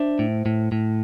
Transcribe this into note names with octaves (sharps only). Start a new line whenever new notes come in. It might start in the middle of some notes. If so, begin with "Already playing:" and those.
Already playing: D4 C5 E5
A2
A2
A2